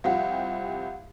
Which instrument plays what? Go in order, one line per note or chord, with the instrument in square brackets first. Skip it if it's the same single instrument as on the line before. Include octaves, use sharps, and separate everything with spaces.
[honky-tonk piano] C2 F3 G4 [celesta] F5 F#5